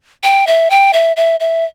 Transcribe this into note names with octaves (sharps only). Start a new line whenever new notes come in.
G5
E5
G5
E5
E5
E5